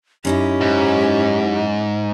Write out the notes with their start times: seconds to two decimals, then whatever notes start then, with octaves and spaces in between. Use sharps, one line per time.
0.25 F#2 C#4 D#4 E4 G4
0.61 G#2